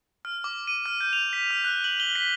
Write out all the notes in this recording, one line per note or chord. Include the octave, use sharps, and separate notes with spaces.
F6
D6
D#7
F6
G6
F7
B6
F6
F#6
F#7
G7
B6